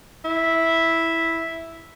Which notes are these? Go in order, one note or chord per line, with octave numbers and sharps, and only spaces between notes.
E4